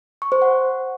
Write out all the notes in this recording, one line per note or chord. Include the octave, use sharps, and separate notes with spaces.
C#6
C5
F#5